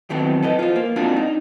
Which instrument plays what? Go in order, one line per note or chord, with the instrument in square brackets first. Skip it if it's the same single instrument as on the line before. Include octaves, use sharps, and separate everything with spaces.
[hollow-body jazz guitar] D#3 E3 F#3 A3 B3 C4
A4 B4 D#5
F4 C5
A#3
G#3 C4 D4 D#4 F4 F#4
D#4